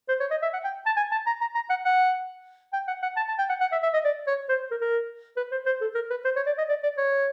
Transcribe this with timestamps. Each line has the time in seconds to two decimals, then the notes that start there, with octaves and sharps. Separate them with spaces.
0.09 C5
0.20 C#5
0.31 D#5
0.42 E5
0.53 F#5
0.64 G5
0.86 A5
0.97 G#5
1.12 A5
1.27 A#5
1.41 A#5
1.55 A#5
1.70 F#5
1.85 F#5
2.73 G5
2.88 F#5
3.03 F#5
3.17 A5
3.28 A5
3.38 G5
3.49 F#5
3.61 F#5
3.72 E5
3.83 E5
3.94 D#5
4.05 D5
4.27 C#5
4.49 C5
4.71 A#4
4.81 A#4
5.37 B4
5.52 C5
5.66 C5
5.81 A4
5.95 A#4
6.10 B4
6.25 C5
6.36 C#5
6.47 D5
6.58 D#5
6.69 D5
6.83 D5
6.98 C#5